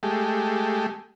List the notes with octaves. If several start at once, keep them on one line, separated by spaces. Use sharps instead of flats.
G#3 A3 G4